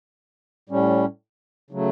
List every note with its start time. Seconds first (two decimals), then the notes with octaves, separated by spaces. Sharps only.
0.69 A2 G3 C#4
1.71 C#3 F#3 A3